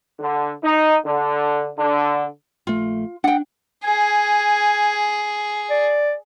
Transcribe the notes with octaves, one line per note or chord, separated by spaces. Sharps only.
D3
D#4
D3
D3
A#1 A3 F4
D4 F#5 G5
G#4 G#5
D5